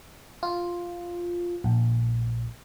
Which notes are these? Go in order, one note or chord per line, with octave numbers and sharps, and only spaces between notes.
F4
A#1